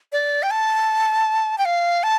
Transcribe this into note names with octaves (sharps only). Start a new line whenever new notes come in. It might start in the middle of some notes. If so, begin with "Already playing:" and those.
D5
G5
A5
G5
F5
A5